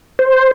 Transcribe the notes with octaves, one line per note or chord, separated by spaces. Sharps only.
C5